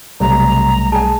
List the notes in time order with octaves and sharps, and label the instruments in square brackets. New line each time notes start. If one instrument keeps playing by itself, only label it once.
[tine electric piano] B1 G3 A3 [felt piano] C3 [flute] A#5
[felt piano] G#4 G#5 [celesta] A5